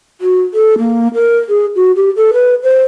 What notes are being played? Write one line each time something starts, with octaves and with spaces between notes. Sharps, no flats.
F#4
A4
A#3
A#4
G#4
F#4
G4
A4
B4
C5